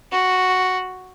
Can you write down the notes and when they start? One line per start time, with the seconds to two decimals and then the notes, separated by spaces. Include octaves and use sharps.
0.12 F#4